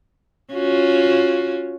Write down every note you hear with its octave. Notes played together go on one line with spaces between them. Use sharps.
C#4 F4 F#4